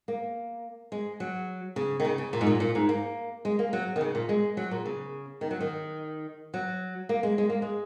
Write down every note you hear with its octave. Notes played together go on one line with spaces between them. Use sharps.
A#3
G#3
F#3
C#3
D#3
C#3
C#3
A#2
G#2
A#2
A#2
G#2
A#3
G#3
A#3
F#3
D#3
C#3
A#2
G#3
F#3
A#2
C#3
D#3
F#3
D#3
F#3
A#3
G#3
G#3
A#3
G#3